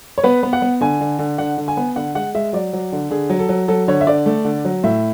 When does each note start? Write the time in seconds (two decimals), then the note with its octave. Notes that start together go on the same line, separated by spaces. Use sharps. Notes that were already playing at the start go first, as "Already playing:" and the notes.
0.18 C#5
0.24 B3 B4
0.43 B3
0.53 F#5
0.62 B3
0.81 D3 G#5
1.01 D3
1.19 D3
1.38 D3 F#5
1.58 D3
1.68 G#5
1.77 B3
1.96 D3 F#5
2.15 G#3 F#5
2.35 G#3 E5
2.53 F#3 D5
2.73 F#3
2.92 D3
3.10 D3 G#4
3.30 F#3
3.39 A4
3.49 F#3
3.68 F#3 A4
3.88 D3 C#5
4.01 E5
4.07 D3 D5
4.26 A3
4.45 D3
4.65 F#3
4.84 A2 E5